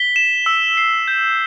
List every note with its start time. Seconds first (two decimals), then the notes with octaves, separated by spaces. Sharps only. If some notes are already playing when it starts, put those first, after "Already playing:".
Already playing: B6 G7
0.16 E7
0.46 E6
0.77 C7
1.08 G6